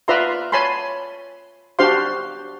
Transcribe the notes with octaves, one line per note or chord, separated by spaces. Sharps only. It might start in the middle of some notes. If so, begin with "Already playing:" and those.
F4 B4 D5 E5 A#5 C6
C#5 G#5 A5 B5 C6
D4 F#4 G4 C5 F5 C6